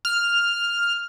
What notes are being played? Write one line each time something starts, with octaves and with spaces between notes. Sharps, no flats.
F6